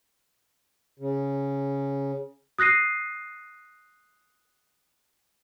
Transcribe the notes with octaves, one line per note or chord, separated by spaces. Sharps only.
C#3
D#6 F#6 A#6 C7 D#7